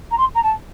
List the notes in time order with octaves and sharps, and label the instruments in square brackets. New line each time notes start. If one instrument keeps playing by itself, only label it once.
[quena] A#5
C6
A#5
A5